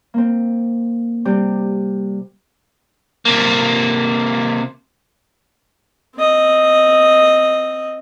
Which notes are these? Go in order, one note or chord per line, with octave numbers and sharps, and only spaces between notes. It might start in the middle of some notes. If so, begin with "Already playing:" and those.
A#3 C4
C3 G3 C4 G4
C3 A#3
C4 D#5